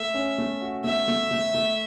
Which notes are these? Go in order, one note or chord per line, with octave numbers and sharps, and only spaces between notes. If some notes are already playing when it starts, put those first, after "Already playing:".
Already playing: A3 E5
C#4
A3
F#4
A3 E5
A3
A3
A3